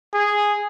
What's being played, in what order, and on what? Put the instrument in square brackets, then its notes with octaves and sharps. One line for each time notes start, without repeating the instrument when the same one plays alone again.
[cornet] G#4